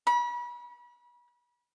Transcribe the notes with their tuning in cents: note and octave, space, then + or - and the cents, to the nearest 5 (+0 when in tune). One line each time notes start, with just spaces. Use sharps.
B5 -35